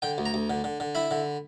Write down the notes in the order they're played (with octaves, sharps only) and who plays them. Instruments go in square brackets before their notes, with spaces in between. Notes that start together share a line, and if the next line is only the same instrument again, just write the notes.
[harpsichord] D3 G5
D2
A#5
D2
D3
D3
D3
E4 B5
D3